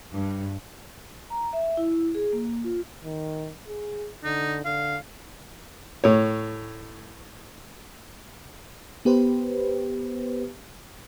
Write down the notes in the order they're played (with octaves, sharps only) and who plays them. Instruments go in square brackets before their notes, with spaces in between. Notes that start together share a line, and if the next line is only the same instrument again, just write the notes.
[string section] G2
[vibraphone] A#5
E5
E4
G#4
A#3
F4
[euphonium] D#3
G#4
[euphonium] D3 [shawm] D#4
[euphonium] D3 [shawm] F5
[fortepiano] A2 C#5
[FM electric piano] B3 G4 B4 C5